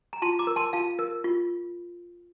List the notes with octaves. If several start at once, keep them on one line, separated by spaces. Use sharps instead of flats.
A#5
F4 A5 C6
A#5 D6
A#4
A5 C6
F4 F5 A5
A#4
F4